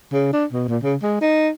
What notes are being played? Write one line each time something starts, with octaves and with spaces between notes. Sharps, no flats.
C#3
D4
B2
A#2
C#3
G#3
D#4